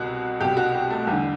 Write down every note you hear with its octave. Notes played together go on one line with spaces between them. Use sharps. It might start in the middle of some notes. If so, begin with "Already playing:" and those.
Already playing: C2 B2 F#4
C2 B2 G4
F#4
G4
A3
E2 D3 G3